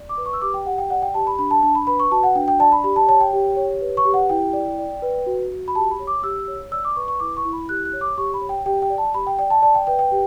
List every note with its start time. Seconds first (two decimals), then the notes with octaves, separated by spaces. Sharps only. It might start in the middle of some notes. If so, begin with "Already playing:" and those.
Already playing: D5
0.09 D6
0.18 B4
0.26 C#6
0.33 E6
0.42 G4 D6
0.54 G5
0.66 G4 F#5
0.78 G5
0.90 D5 F#5
1.02 G5
1.14 G4 A5
1.27 B5
1.39 D4 B5
1.51 A5
1.63 D4 A5
1.75 B5
1.87 B4 B5
2.00 C#6
2.11 F#4 A5
2.23 F#5
2.36 D4 G5
2.48 G5
2.60 D5 A5
2.72 B5
2.84 G4 B5
2.96 A5
3.08 C#5 A5
3.21 G5
3.33 G4
3.57 C#5
3.81 B4
3.97 C#6
4.05 G4
4.14 F#5
4.29 E4 G5
4.53 D5
4.79 D5
5.02 B4
5.26 F#4
5.51 F#4
5.68 B5
5.75 G4 A5
5.91 B5
5.99 C#5
6.07 D6
6.23 G4 E6
6.48 C#5
6.71 D5 E6
6.85 D6
6.96 B4 C#6
7.08 C#6
7.20 E4 D6
7.37 C#6
7.45 E4
7.53 B5
7.69 G4 F#6
7.85 F#6
7.93 C#5
8.01 D6
8.18 G4 C#6
8.34 B5
8.41 C#5
8.49 G5
8.66 G4 G5
8.82 G5
8.90 D5
8.98 A5
9.14 G4 B5
9.27 G5
9.39 D5 G5
9.50 A5
9.62 D5 A5
9.75 G5
9.87 B4 G5
9.99 G5
10.11 G4